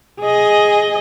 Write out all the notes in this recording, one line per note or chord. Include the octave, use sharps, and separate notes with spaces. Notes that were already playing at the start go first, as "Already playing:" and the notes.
G#4 D#5